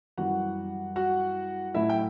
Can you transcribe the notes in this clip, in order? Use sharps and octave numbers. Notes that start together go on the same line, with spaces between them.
F#2 E3 G3 F#4 F#5
F#4 F#5
A2 F#3 A3 E4 E5
G5